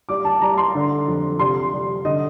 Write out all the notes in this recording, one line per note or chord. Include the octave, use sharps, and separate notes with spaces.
G3 D6
A5
G3 A#5
C6
D3
F2
C3 C6
G3
D3 D#5